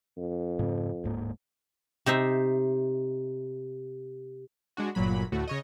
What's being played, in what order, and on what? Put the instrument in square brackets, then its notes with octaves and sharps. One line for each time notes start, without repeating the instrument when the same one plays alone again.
[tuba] F2
[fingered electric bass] G#2 C#3 C4
D1 G#2 A#3
[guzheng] C3 D#4 C5 E5
[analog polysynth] G#3 D4 F#4
G1 A#2 F#3 B5
D2 A2 A3 F#4
C#3 C#5 D#5